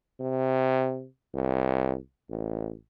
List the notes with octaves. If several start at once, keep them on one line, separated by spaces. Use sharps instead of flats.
C3
C2
A1